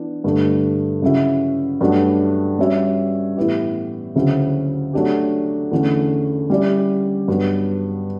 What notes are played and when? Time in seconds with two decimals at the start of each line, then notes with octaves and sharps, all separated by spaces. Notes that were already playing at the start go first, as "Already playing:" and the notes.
Already playing: E3 B3 D4
0.24 G2 D3 A3 D4
1.02 C#3 F#3 C#4 E4
1.81 G2 F#3 A3 D4
2.59 G3 C#4 F#4 C#5 E5
3.37 A2 E3 B3 E4 G4
4.15 D2 C#3 F#3 C#4 E4
4.93 F#3 A3 D4 G4
5.71 E2 D3 A3 C#4
6.50 G3 C#4 E4 G4 D5
7.28 G2 F#3 B3